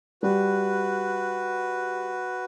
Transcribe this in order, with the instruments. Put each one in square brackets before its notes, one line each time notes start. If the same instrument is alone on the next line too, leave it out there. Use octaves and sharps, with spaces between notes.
[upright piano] G3 [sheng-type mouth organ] F#4 B4